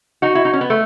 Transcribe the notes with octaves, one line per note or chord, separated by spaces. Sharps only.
D#4 F#4
E4
D#4
C#4
B3
A3